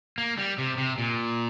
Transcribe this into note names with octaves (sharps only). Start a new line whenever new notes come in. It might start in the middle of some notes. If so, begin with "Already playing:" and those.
A#3
G3
C3
C3
A#2